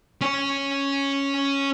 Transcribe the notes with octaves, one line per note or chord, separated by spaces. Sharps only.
C#4 C#5